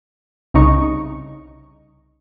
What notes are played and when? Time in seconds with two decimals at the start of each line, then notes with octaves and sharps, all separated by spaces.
0.54 C2 C#3 D#4 C#6